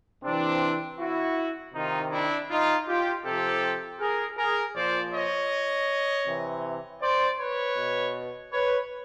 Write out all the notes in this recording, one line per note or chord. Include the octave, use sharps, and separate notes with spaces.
C3 E3 C4 D4
E4 F#4
C3 D#3 D#4 F4
D4 E4
D#4 F4
F4 G4
C3 F3 G4 A4
G#4 A#4
G#4 A#4
A#2 F3 C5 D5
C#5 D#5
C3 E3
C5 D5
B4 C#5
B2
B4 C#5